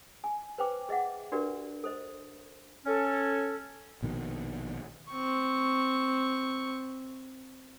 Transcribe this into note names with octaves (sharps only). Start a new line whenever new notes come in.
G#5
B4 C5 G5 D6
G#4 D#5 E5 F#5
D4 F#4 G4 A#4 B4 D5
A4 C5 D#5
C#4 A4
A#1 B2 D#3
C4 C#6